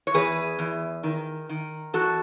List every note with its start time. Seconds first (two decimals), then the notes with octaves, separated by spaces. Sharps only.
0.07 C#5
0.14 E2 G#4 B4
0.59 E2
1.03 D#3
1.49 D#3
1.94 E2 F#4 A4